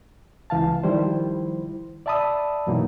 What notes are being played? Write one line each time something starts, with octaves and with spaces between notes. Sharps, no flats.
C#2 E3 F5 A5
D#3 F3 G3 E4 C5
D5 E5 A5 B5 D#6 E6
F#2 B2 E3 F#3 A#3 D#4